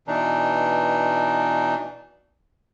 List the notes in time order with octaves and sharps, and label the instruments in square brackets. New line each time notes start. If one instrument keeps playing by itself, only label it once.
[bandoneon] B2 E3 D4 D#4